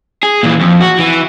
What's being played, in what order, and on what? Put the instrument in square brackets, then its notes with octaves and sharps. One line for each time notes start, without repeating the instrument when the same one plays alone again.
[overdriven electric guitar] G#4
A#2 E3
F2
F#4
E3